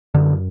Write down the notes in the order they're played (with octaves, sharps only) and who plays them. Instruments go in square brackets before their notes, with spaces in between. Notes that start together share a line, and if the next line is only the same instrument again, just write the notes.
[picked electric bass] F#2 D3